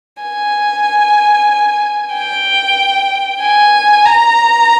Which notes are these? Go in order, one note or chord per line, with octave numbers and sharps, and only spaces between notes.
G#5
G5
G#5
A#5